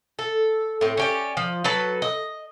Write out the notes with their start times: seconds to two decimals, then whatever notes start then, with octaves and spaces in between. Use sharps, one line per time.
0.19 A4
0.81 A2 C4
0.97 C#4 G4 D5
1.37 F3
1.64 F#3 A4 B4 A5
2.02 D#5